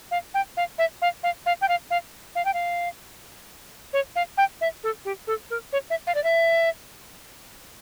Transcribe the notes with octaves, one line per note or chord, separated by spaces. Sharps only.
F5
G5
F5
E5
F5
F5
F5
G5
F5
F5
F5
G5
F5
C#5
F5
G5
E5
A4
G4
A4
A#4
C#5
E5
F5
D5
E5